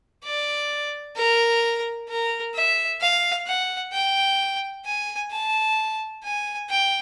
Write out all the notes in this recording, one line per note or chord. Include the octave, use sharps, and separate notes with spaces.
D5
A#4
A#4
E5
F5
F#5
G5
G#5
A5
G#5
G5